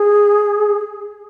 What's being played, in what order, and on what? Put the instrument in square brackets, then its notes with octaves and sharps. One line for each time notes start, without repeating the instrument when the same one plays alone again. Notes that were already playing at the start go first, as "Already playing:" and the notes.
Already playing: [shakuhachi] G#4